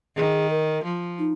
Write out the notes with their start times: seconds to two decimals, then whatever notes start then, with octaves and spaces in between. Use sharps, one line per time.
0.16 D#3 G#4
0.50 A#4
0.84 F3
1.19 D#4